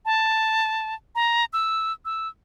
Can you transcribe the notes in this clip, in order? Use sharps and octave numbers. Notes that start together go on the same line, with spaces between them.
A5
A#5
E6
E6